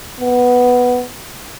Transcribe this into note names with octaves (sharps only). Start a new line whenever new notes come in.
B3